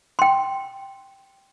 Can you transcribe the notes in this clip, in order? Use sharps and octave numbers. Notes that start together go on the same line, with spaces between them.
G5 C6